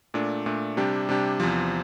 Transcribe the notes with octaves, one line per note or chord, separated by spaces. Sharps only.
A#2 A3 D4
A#2 A3 D4
C3 G3 D4 G4
C3 G3 D4 G4
E2 C3 F3